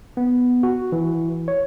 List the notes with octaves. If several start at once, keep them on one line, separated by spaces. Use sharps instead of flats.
B3
F#4
E3
C#5